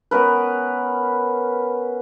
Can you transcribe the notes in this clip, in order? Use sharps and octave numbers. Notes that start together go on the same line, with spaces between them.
B3 C#4 A#4 B4